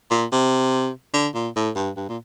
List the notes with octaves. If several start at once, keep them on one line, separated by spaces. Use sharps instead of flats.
A#2
C3
D3
A#2
A2
G2
G2
A#2